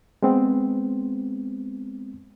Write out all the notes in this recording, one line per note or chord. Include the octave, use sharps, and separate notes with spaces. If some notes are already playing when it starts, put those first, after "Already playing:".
G#3 B3 C4